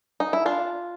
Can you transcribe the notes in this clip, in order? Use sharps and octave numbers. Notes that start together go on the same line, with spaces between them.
D#4
E4
D4 F4